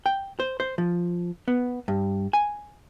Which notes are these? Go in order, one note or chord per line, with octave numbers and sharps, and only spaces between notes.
G5
C5
C5
F3
B3
G2
G#5